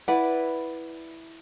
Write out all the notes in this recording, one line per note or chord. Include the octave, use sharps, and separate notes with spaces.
E4 B4 D5 F#5